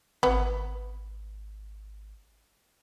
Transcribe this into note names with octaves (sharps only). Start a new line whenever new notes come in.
G#1 B3